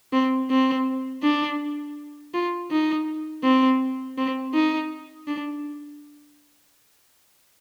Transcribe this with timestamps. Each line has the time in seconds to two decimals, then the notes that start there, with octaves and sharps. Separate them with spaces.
0.13 C4
0.50 C4
1.23 D4
2.34 F4
2.71 D#4
3.43 C4
4.18 C4
4.54 D#4
5.28 D4